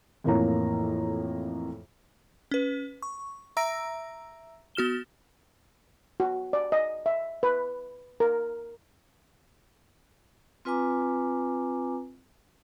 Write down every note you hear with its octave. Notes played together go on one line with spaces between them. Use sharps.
F2 A2 E3 A#3 C#5 A#5
C#4 B4
C#6
E5 A#5 E6 A#6 D7
B3 F#4 F6 E7 G7
F#4
D5
D#5
E5
B4
A#4
C4 F4 B4 G#5 A#5 D6